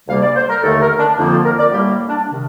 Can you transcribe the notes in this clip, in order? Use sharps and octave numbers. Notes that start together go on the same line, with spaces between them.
D2 C3 G3 A#3 F5
D5
C5
A#4
D#2 D3 A3 A4
A#4
D4
F2 D3 F3 A#3 D#4
F4
A#4
D5
A2 G3 A#3 G4
D4
C3 D#3